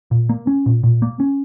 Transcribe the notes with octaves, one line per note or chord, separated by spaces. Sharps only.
A#2
A#3
C#4
A#2
A#2
A#3
C#4